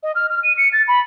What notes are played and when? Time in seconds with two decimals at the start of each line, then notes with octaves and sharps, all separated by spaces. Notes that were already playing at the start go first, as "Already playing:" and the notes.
0.03 D#5
0.15 F6
0.29 F6
0.43 D#7
0.57 C#7
0.73 A6
0.88 B5